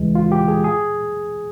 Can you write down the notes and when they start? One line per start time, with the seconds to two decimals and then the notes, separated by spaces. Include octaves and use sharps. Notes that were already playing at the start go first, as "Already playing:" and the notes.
Already playing: D#2 C#3 E3 G#3
0.15 F4
0.32 G4
0.48 G#4
0.64 G#4